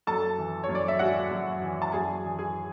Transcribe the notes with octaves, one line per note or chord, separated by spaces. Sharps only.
F#2 A4 A5
E3
C#5
F#2
D5
E5
G#3 F#4 F#5
F#2
E3
A5
F#2 G#4 G#5
E3
G#4 G#5